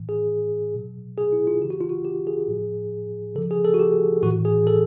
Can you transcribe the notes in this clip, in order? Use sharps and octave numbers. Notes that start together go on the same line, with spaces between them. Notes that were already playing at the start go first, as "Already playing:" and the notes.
Already playing: A2 E3
G#4
B2 F#3
G#4
E4
F4
C#3 E3 G4
F#4
F4
F#4
G4
G#4
A2 F3
C#3 F3 A4
G#4
A4
F#4
G4
A2 E3 F#4
G#4
A4